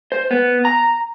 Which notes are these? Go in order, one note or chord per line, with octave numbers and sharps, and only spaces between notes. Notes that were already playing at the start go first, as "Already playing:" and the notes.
C5
B3
A#5